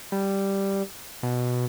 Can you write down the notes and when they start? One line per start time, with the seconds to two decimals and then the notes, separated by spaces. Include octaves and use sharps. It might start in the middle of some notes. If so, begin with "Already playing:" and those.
0.12 G3
1.23 B2